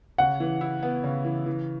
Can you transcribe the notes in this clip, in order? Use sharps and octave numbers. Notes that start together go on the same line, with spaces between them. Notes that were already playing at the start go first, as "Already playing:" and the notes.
C#3 F#5
E3
E4
B3
C#3
E3
E3